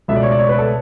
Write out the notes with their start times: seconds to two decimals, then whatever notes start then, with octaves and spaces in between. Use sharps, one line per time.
0.08 C#2 B2 A3 E5
0.16 D5
0.23 C#5
0.31 D5
0.39 C#5
0.49 B4
0.59 A4